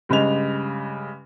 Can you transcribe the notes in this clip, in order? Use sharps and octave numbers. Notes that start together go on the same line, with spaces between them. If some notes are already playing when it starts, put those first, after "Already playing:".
G2 C#3 G#3 F7